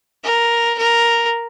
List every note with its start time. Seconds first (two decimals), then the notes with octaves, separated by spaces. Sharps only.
0.24 A#4
0.78 A#4